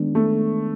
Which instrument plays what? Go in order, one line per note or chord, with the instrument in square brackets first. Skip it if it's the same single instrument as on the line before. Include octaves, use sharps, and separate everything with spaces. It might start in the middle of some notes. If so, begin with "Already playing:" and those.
Already playing: [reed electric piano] D#3 G#3 B3 D4
[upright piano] A3